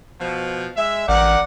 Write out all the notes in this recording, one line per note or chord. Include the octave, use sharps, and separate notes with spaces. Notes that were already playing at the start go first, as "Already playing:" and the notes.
B2 F3
G#3 E5
A1 G4 A#4 D5 F#5